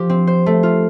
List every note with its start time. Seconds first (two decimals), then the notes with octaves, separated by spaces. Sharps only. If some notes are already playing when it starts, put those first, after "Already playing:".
Already playing: F3 G4
0.10 C4
0.27 C5
0.46 A3
0.63 F4